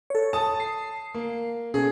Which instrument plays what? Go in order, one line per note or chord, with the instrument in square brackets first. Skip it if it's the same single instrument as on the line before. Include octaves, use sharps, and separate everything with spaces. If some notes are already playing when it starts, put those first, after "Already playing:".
[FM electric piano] A4 C#5
[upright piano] A5 D#6
[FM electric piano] C7
[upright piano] A#3
[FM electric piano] B2 C#4 A4 [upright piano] G#4